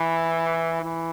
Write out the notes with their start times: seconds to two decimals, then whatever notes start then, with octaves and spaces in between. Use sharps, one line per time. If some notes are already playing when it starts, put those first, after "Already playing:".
Already playing: E3
0.82 E3